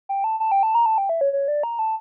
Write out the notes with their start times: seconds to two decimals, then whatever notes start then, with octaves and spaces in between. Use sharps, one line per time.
0.09 G5
0.24 A5
0.40 A5
0.52 G5
0.63 A5
0.75 A#5
0.86 A5
0.98 G5
1.09 E5
1.21 C#5
1.33 C#5
1.48 D5
1.63 A#5
1.79 A5